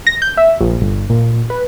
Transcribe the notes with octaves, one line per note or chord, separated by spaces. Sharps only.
A#6
G6
E5
A#1
G1
A#2
B4